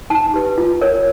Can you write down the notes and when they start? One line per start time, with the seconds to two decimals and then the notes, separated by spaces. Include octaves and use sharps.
0.10 D#4 A5
0.34 G4 B4
0.58 F4
0.81 A#4 C#5